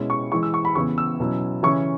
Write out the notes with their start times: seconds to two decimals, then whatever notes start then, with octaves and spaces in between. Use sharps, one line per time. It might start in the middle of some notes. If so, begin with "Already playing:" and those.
Already playing: B2 G#3 C#4 E4
0.10 C#6
0.31 E3 G#3 E4 C#6
0.43 E6
0.54 C#6
0.65 B5
0.75 C#3 E3 B3 E4 C#6
0.98 E6
1.20 B2 F#3 C#4 E4
1.63 C#3 E3 C#4 E4 C#6